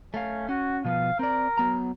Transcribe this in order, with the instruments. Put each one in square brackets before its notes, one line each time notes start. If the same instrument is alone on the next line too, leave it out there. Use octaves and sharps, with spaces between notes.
[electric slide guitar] A3 F5 [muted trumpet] C#4
[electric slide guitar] C#4 [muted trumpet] F#4
[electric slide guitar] B2 F3 B3 [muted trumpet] F5
[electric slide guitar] C4 D5 [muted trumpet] A#4
[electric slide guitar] F#3 B3 A#5